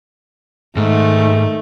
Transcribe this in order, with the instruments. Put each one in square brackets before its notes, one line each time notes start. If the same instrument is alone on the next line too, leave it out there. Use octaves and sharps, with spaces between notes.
[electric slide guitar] G#2 [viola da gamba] D#3 A3